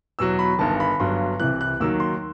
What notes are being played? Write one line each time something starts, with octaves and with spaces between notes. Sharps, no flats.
E2 B2 F#3 E6
B5
G1 G2 D#3 A5
B5
G1 G2 F#3 C6
C2 C3 E3 F#6
F#6
D#2 D#3 F#3 E6
C6